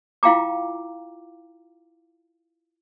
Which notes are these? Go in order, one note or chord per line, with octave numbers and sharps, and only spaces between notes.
E4 F4 F5 G5 A#5 D6